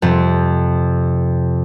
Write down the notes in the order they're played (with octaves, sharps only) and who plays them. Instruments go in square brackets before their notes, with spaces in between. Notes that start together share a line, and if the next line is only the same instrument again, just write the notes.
[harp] F2 C3